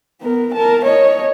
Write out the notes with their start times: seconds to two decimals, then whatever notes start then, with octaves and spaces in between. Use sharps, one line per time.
0.21 B3 A#4
0.54 A#4 A5
0.85 C#5 D#5